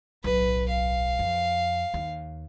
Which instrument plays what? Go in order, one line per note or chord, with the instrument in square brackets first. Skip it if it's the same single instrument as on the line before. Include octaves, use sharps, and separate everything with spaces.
[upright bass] D1 B1 [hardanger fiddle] B4
[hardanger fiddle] F5
[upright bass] F2
D#2